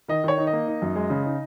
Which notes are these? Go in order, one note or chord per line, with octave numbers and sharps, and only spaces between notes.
D#3 D#5
D#3 C#5
D#4
D#5
A#3
D#4
F#2
G#3
C#3
D#4